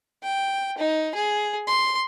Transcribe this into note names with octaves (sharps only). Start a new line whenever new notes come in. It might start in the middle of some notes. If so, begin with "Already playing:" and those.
G5
D#4
G#4
C6